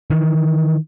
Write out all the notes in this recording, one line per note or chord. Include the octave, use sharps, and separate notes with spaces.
D#3 E3